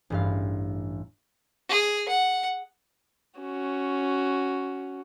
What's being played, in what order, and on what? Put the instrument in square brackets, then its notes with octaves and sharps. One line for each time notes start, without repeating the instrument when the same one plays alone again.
[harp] A1 G2 F5
[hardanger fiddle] G#4
F#5
[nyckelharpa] C#4 F#4